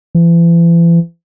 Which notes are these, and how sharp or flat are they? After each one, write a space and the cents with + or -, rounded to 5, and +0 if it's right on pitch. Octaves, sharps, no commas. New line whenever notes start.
E3 +40